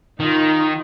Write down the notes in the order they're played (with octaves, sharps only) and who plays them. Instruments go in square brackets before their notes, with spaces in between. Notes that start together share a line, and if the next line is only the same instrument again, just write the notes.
[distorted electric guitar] D#3 [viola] D#4 F4